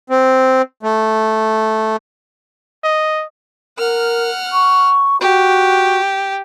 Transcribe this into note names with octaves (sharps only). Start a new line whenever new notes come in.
C4
A3
D#5
A#4 F#5 F6
C#6
F#4 G4